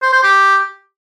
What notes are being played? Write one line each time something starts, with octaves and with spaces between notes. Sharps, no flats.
C5
C5
G4